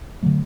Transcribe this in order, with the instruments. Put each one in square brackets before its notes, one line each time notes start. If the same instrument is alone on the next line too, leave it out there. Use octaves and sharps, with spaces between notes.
[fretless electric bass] D3 F#3 A3